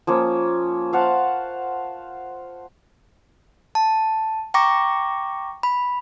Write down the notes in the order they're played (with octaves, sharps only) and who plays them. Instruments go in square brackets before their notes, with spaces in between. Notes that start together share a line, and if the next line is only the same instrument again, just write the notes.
[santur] F3 A#3 C#4
C5 F5 F#5 A5
[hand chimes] A5
G5 A#5 C#6 D6 A#6
B5